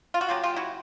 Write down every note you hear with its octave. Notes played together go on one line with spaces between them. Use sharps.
F4
F#4
C#3 F#3 A#3 F4 G4
F4 G4
E4 F#4